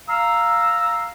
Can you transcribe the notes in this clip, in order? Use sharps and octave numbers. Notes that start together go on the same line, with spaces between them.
F5 A#5 E6